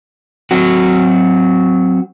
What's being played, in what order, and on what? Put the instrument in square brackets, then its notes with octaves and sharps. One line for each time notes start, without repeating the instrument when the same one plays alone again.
[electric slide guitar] F#3 C4 F#4